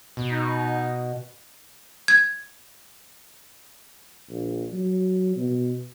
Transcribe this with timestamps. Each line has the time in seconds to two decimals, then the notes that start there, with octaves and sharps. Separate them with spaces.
0.17 B2
0.30 D#4
2.08 G#6
4.29 A#1
4.72 F#3
5.36 B2